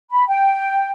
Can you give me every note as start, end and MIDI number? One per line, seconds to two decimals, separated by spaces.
0.11 0.27 83
0.28 0.90 79